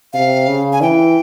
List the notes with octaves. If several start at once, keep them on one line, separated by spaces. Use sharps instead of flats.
C3 F5
C#3
G#5
E3 G5